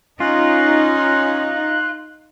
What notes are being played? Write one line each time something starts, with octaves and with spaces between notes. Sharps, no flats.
C#4 D#4 F4 F#6